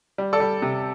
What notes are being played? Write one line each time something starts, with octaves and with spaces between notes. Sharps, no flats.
G3
A4 D5
G3
C3